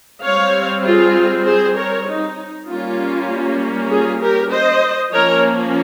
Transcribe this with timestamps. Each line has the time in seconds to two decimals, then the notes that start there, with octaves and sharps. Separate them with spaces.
0.23 G3 C4 C#5 F5
0.85 F4 G#4
1.45 G#4 C5
1.76 A#4 C#5
2.06 D#4
2.68 G3 A#3 C#4 F4
3.90 F4 G#4
4.21 G4 A#4
4.51 C5 D#5
5.13 F3 A#3 C#4 A#4 C#5